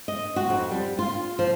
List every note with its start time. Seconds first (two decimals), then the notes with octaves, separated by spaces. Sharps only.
0.08 D#5
0.36 F#4
0.50 F2
0.71 G3
0.99 F4
1.39 F3